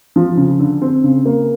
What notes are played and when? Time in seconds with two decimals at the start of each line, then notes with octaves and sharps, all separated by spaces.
0.16 F3
0.37 C#3
0.60 D3
0.82 C4
1.04 C#3
1.25 A#3